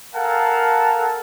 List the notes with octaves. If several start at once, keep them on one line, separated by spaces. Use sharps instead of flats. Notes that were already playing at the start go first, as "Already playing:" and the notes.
A4 A#4 F5 F#5 G#5 A5